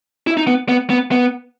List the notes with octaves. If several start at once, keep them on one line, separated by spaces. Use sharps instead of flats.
E4
D#4
B3
B3
B3
B3